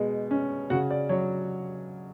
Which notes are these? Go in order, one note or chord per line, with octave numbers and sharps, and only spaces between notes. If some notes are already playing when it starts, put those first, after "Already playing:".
Already playing: B2 G#3
C#4
C#3 F#4 F#5
D5
F#3 C#5